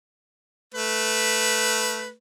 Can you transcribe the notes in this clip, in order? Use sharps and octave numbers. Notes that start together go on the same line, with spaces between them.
A3 B4